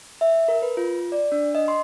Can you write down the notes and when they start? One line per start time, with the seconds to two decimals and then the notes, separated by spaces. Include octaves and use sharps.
0.21 E5
0.48 A#4
0.62 B4
0.77 F4
1.12 D5
1.32 D4
1.55 D#5
1.68 C6